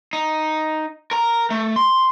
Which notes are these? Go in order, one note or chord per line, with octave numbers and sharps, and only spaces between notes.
D#4
A#4 A#5
A3
C6